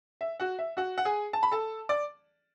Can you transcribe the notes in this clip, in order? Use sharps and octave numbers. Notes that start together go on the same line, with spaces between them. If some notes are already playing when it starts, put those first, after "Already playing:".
E5
F#4 F#5
E5
F#4 F#5
F#5
G#4 G#5
A5
B5
A4 A5
D5 D6